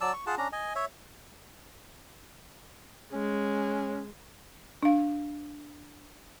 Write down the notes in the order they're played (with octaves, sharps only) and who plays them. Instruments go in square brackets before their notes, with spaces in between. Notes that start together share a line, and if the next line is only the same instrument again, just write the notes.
[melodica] F#3 D5 A5 E6
C#6
F4 G#4 F#5 A5
C#4 D4 A#5
D#5 G#5
C#5 E5
[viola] G#3 [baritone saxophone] C#4
[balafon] D4 F5